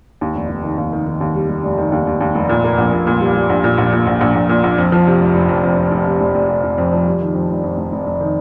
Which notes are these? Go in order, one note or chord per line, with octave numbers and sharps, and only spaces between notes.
D#2
F1
F1
D#3
D#2
D#3
D#3
D#2
G3
G3
F1
D#3
D#2
D#2
D#2
F1
A#2
A#3
A#1
A#2
A#2
G3
G3
A#1
A#2
A#1
A#2
A#1
A#1
A#1
A#2
A#1
F2
F3
C3
F1
F1
F2
F2
F2
F1
C3
F1
F1
C3
F1
F2
F3
G3
D#3
F2
F1
F2
F1
F1
F1
D#3